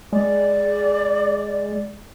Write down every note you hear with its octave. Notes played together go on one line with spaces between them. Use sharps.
G#3 D5